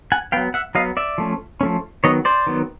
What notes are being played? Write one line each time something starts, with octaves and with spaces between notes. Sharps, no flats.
F#5 G#5
F#3 B3 F5 G5
E5 F#5
F#3 B3 D#5 F5
D5 E5
F3 A3 C#4
F3 A3 C#4
D#3 F#3 B3 C#5 D#5
C5 D5
D#3 F#3 B3